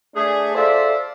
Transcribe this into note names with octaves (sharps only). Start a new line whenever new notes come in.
A3 D4 G#4
F4 A4 C5 D5 E5